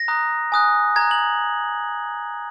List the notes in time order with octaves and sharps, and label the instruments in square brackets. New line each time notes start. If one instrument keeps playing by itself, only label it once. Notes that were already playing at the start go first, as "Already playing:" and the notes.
Already playing: [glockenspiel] A#6
A#5 D#6 F#6
G#5 D#6 F#6
A#5 F#6 G#6
F#7